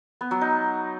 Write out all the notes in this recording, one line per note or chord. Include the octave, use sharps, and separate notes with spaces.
B3
F#3
D#4